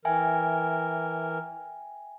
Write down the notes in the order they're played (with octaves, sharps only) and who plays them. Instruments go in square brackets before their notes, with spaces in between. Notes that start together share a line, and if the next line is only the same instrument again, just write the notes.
[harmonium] E3 A#4 [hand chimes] E5 G5 G#5